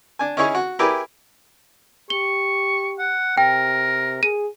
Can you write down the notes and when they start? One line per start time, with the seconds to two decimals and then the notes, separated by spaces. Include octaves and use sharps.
0.19 D4 G#5
0.37 C#4 D#4 E4 G#4 C#5
0.55 F#4
0.79 E4 G4 G#4 A#4 B4 D5
2.10 G4 C#6 G7
2.99 F#5
3.38 C3 A#4 G5
4.23 G#4 D#7